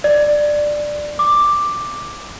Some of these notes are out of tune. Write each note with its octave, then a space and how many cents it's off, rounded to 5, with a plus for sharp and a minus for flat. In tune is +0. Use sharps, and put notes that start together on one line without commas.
D5 +10
D6 +5